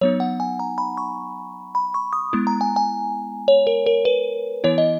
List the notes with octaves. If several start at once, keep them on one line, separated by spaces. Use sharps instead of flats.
F#3 B3 D#4 C#5
F#5
G#5
A#5
B5
C#6
B5
C#6
D#6
G#3 B3 E4
A#5
G#5
G#5
C#5
A#4
A#4
B4
E3 B3 E4 C#5
D#5